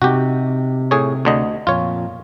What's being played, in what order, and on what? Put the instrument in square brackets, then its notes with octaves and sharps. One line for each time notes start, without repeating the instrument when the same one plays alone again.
[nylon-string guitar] C3 D#4 [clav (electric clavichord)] F#4 G4
[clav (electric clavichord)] A2 G#4 C#5
D2 D3 D#5
[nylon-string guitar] F2 A#2 [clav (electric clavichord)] F4 C#5